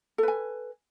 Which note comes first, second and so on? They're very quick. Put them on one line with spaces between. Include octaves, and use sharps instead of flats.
A4 B4 G#5